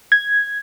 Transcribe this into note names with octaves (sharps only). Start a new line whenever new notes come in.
G#6